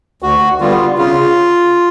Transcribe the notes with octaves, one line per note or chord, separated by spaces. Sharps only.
D2 F#4
D3 G3 B3 F4
C#3 F4